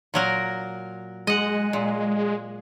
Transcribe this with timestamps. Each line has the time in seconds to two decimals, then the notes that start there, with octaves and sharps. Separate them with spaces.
0.14 A#2 F#3 A#4
1.27 G#3 D#5 F#5
1.73 A#2